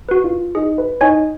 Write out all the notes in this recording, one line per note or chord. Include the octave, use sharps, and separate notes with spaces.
F#4 B4
F4
D#4 G#4
B4
D#4 C#5 G#5